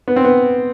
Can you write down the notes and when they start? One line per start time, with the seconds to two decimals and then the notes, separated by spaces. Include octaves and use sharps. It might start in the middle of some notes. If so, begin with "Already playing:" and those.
0.08 B3
0.16 C4
0.25 B3